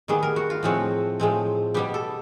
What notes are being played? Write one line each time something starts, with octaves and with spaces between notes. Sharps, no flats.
D#3 G3 B3 G#4
A#4
F#4
F4
A2 F3 G#3 C4 F#4
A2 F3 G#3 C4
B2 G3 B3 G4
A4